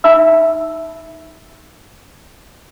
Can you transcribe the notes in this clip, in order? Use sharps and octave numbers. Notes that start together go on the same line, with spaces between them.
D#4 E5 B5 E6